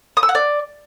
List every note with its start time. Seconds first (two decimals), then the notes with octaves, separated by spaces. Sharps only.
0.17 D#6
0.23 E6
0.29 F#5
0.35 D5